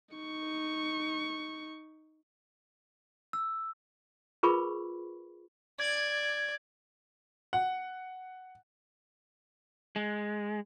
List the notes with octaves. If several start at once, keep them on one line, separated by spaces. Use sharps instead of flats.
D#4 C#6
E6
F4 G#4 A#4 B4 B5 C#6
D5 G#6
F#5
G#3